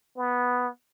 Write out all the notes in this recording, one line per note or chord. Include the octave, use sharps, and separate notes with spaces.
B3